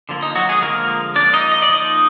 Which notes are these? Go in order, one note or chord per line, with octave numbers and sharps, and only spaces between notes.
D3 F3 A#3
D#4
F#3 F#4
G#3 G#4
D3 F3 G#3 A#3 A#4
F3 A#3 D4 D5
D#4 D#5
D#5
D5
F3 A#3 D#4 D#5